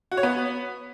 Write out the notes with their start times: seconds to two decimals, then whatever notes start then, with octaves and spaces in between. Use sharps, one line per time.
0.12 F#4
0.17 C#5
0.23 B3